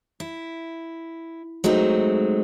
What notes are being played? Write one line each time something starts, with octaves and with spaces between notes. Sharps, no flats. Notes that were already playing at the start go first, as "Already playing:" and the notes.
E4
F#3 G#3 A3 C4 D#4